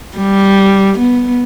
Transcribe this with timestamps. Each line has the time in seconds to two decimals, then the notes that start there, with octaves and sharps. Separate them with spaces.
0.17 G3
0.99 B3